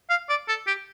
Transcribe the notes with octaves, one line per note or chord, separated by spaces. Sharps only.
F5
D5
A4
G4